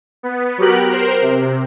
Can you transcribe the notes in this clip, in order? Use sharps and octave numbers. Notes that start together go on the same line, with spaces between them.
B3
F#3 B3 G4 A#4 F#6
A#4 C5
C3